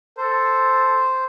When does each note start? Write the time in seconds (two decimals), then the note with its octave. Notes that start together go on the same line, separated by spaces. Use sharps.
0.17 A4 C5